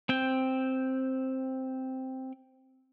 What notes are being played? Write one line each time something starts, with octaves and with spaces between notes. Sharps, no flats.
C4 G5